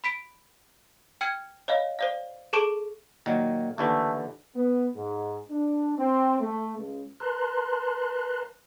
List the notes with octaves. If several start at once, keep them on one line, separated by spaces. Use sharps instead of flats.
B5 B6 D7
G5 F6 G#6 C#7
C#5 D#5 F5
C5 D5 F5
G#4 A4 A5 C#6 D6 D7
A#2 D#3 F#3
D#2 D3 E3 A3
B3
G#2
D4
C4
A3
C#2
A#4 B4 A5 A#5 C6 F#6